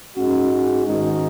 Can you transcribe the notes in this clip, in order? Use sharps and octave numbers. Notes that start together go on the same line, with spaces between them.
G#2 G#3 C#4 F#4
G#2 D#3 G#3 D#4 F#4